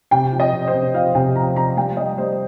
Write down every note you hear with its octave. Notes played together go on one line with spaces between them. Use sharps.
C3 G5
F3
D#5
C3
C5
C3
F3 F5
C3 G5
F3 A#5
F3 A#5
G3 G5
G3 D#5
G3 C5